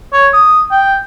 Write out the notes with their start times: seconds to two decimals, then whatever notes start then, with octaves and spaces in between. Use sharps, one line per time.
0.13 C#5
0.33 D#6
0.71 G5